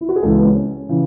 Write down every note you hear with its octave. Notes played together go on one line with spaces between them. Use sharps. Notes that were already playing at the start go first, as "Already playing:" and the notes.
E4
F#4
G#4
C#2 C#3 E3 A4
B3
C#4
C#4
C#3 E3